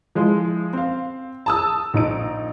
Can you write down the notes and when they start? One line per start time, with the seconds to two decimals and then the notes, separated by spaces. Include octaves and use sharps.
0.15 F3 G#3 E4
0.73 C4 F5
1.46 A5 D#6 E6
1.94 A#1 D#4 D7